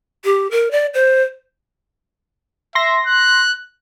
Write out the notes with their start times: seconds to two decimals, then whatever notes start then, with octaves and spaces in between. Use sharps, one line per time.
0.24 G4
0.51 A#4
0.71 D5
0.94 C5
2.75 E5 C6 A#6
3.06 F#6